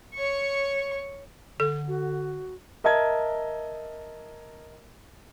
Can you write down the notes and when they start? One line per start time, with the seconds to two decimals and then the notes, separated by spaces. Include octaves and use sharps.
0.14 C#5 C#6
1.60 D3 A4
1.88 F#4
2.84 A#4 D#5 E5 A5 G#6